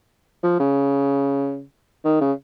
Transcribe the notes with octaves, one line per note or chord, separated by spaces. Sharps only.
F3
C#3
D#3
C#3